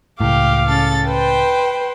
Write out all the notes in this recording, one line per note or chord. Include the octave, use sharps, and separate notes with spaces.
C#2 A2 G4 F5 D6
C#3 A4 A6
B4 C5 G5